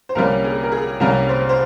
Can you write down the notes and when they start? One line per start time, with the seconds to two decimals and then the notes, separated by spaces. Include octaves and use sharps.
0.09 C5
0.15 C2 C3 G3 A#3 C#4 A#4
0.44 G#4
0.63 A#4
0.72 G#4
1.00 C2 C3 G3 A#3 C#4 A#4
1.29 C5
1.49 C5